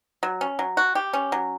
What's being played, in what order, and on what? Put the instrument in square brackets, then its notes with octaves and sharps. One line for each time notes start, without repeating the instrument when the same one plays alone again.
[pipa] F#3
C#4
F#3
F#4
G4
C#4
F#3